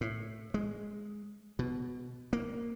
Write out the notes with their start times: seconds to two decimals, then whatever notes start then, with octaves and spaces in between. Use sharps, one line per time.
0.01 A2
0.54 G#3
1.59 B2
2.33 A#3